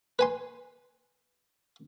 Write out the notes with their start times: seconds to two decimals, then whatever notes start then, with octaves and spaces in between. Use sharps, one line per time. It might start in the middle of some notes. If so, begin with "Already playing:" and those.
0.19 B4 G#5 C6